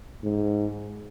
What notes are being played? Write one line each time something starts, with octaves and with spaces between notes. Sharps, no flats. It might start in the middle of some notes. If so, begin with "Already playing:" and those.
G#2